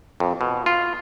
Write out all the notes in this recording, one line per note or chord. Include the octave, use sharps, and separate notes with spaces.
F2
B2
F4